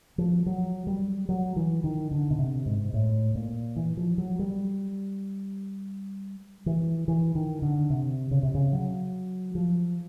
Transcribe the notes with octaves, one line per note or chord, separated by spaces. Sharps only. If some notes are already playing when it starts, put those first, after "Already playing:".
F3
F#3
G3
F#3
E3
D#3
D3
B2
C3
G#2
A2
A#2
E3
F3
F#3
G3
E3
E3
D#3
D3
C3
C#3
C3
C#3
F#3
F3